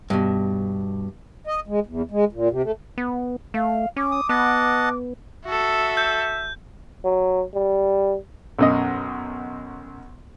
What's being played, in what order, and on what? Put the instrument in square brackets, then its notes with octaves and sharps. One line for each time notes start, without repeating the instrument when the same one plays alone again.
[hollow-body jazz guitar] G2 B2
[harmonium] D#5
G#3
E2
G#3
A#2
C3
A3
[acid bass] B3
[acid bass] A3 [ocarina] F5
[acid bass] C#4 [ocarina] D6
[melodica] D#6
[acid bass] B3 [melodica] D#5 F#5 A5
[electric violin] F#4 A4 [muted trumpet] E5
[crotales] G6
[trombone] F#3
G3
[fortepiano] B1 F#2 D#5